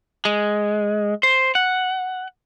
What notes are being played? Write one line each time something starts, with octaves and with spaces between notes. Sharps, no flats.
G#3
C5
F#5